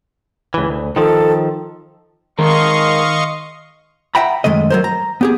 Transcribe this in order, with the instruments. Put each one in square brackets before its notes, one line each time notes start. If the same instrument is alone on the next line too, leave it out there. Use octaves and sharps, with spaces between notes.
[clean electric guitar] C#2 E3
D2
[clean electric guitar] D#3 F3 [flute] A4
[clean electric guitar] G#2 G#3 A#4 [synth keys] D#3 [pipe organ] D#5 F5 C#6 [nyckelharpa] C6
[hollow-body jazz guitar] E5 F#5 G5 A#5 B5
F#2 D#3 G#3 A3 D#5
F#3 A#4 C5
A#5
B3 G4 G#4